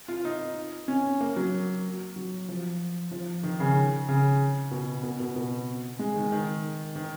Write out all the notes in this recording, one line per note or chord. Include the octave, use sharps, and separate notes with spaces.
F4
D#4
C#4
A#3
F#3
F#3
F3
F3
D#3
C#3
C#3
B2
B2
B2
B2
G#3
D#3
D#3
D#3